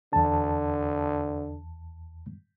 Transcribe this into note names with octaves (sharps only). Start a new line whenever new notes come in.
E2 D3 A5